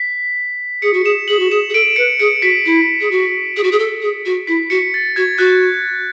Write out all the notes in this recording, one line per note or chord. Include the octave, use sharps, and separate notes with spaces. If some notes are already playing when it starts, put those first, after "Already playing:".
Already playing: B6
G#4 C#7
F#4
G#4 E7
G#4 F#7
F#4
G#4 E7
G#4
A4 D7
B4 C#7
G#4 C#7
F#4 B6
E4
G#4
F#4
G#4
F#4
G#4
A4
G#4
F#4
E4 B6
F#4 C#7
A6
F#4 G#6
F#4 F#6